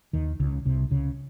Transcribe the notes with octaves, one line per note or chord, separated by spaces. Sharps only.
D#2 D#3
C#2 C#3
C2 C3
C#2 C#3